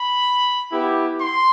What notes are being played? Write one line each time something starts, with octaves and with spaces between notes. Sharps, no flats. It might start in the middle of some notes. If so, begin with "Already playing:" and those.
Already playing: B5
B3 E4 G4
C6